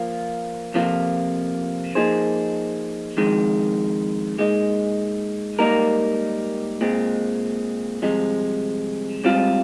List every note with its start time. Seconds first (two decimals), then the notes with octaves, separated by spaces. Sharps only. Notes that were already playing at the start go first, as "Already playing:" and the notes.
Already playing: F3 A#3 F4 A#4
0.74 F2 C3 F3 A#3 F4
1.95 F3 A#3 D#4 G#4 C5
3.17 F2 D#3 G#3
4.38 A#2 G#3 D#4
5.59 G#2 G3 A#3 D#4 A#4
6.81 A#2 G#3 C4
8.02 C2 C3 F3 G#3
9.24 G#2 G3 C4 F4